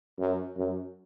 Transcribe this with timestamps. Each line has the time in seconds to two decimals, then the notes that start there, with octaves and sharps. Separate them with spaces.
0.19 F#2
0.57 F#2